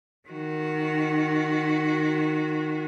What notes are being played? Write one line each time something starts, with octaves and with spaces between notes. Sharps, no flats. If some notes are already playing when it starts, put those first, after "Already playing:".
D#3 F#4